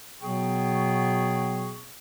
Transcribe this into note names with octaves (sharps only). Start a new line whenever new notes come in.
B2 F#3 B3 G#4 G5 C#6